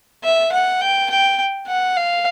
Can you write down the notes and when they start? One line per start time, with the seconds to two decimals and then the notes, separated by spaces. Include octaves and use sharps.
0.24 E5
0.52 F#5
0.81 G5
1.10 G5
1.67 F#5
1.96 F5